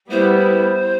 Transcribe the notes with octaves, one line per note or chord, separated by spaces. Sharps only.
G3 B3 E4 C5